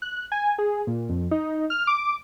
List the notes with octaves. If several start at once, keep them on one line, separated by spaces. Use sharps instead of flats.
F#6
G#5
G#4
A#2
F2
D#4
F6
D6